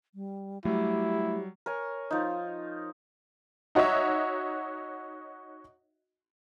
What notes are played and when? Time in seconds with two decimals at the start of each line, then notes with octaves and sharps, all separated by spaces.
0.15 G3
0.65 F#3 G3 A3 E4 G4
1.66 A#4 C#5 G#5
2.11 F3 D#4
3.75 D#4 F#4 C#5 D#5 E5